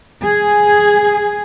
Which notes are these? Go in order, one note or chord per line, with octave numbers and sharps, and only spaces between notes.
G#4